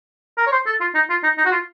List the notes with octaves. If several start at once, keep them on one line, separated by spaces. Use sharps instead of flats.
A#4
C#5
C5
A4
F4
D#4
F4
D#4
D#4
F#4
F4